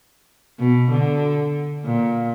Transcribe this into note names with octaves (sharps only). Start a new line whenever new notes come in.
B2
D3
A#2